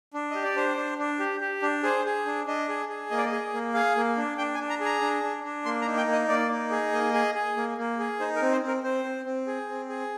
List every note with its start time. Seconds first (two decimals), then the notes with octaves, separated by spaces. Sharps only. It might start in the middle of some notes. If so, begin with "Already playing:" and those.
0.14 D4
0.30 G4 D#5
0.43 D5
0.56 D4 C5
0.77 D4
0.98 D4
1.20 G4
1.41 G4
1.62 D4
1.83 G#4 C5
2.05 G#4
2.26 D4
2.47 D4 D#5
2.69 G#4
2.89 G#4
3.11 A#3 D#5
3.18 D5
3.25 D#5
3.32 G#4
3.53 A#3
3.74 G#4 F5
3.96 A#3
4.17 D4
4.38 D4 G5
4.54 G#5
4.60 D4
4.70 A#5
4.80 G#4
4.85 A#5
5.01 D4
5.23 D4
5.44 D4
5.65 A#3 C6
5.82 A#5
5.86 D#4
5.97 G5
6.07 A#3
6.12 D#5
6.28 A#3 D5
6.51 D#4
6.71 G#4
6.92 A#3 D#5
7.14 G#4
7.35 G#4
7.57 A#3
7.78 A#3
7.99 G#4
8.20 D#4 C5
8.36 A#4
8.41 C4
8.52 C5
8.63 C4
8.68 A#4
8.83 C4 C5
9.05 C4
9.26 C4
9.47 G#4
9.69 C4
9.89 G#4